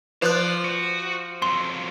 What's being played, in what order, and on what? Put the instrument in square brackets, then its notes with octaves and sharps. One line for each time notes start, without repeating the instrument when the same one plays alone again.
[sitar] F3 [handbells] B4 F#6 [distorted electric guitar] D5
[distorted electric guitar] F#4
[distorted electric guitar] F2 F#3 [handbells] C6